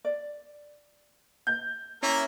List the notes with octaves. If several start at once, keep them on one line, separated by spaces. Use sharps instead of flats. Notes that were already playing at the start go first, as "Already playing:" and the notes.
D5
G6
A#3 C#4 E4 A#4 C#5 E5